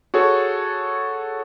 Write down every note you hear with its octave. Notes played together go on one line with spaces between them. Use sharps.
F#4 G#4 A4 C#5